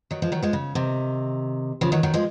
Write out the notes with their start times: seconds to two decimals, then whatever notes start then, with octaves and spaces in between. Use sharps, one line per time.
0.11 D#3 F#3
0.22 F3 G#3
0.32 D#3 F#3
0.42 F3 G#3
0.53 C#3
0.75 C3 D#3
1.81 C#3 F3
1.92 D#3 F#3
2.03 D#3 F#3
2.14 F3 G#3